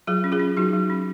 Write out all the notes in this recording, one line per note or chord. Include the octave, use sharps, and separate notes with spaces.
F#3 F4 G#4
C#4
F4 G#4
C#4
F#3 D#4 F#4
F#3
C#4